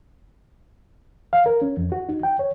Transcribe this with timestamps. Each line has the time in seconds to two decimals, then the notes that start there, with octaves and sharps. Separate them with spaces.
1.33 F5
1.46 A#4
1.62 C#4
1.77 F2
1.92 F#4
2.09 D#4
2.23 G5
2.39 C#5